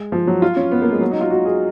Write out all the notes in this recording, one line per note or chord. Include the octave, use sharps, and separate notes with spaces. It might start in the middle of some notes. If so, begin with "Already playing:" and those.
Already playing: G#3
F3
F#3
F4
C#4
B3
A#3
G#3
F#3
D#4
F4
F#4
G#4